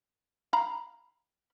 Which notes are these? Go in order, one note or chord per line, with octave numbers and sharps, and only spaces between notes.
F5 A#5 B5